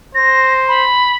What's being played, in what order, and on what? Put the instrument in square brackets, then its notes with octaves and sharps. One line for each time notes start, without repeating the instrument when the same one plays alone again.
[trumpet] C5 [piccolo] A#6
[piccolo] B5